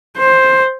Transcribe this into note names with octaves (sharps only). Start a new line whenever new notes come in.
C5